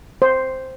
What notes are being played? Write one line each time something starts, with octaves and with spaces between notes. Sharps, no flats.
C5